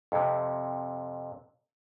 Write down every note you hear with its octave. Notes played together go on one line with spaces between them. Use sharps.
F2 C3